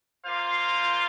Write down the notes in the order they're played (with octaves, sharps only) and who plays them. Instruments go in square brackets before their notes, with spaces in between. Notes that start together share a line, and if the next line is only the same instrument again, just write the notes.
[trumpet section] A#3 F4 C5 F5